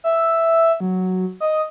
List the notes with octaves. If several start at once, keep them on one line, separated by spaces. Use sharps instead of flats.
E5
F#3
D#5